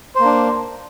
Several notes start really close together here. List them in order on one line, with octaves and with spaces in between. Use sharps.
C5 A#3 D4